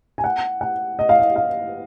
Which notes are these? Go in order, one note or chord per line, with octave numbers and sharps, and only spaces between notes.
G#5
F#5
F#5
D#5
F5
D#5
F5